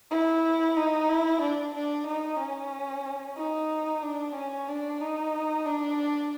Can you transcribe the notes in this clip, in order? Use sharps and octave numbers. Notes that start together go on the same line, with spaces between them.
E4
D#4
E4
D4
D4
D#4
C#4
D#4
D4
C#4
D4
D#4
D4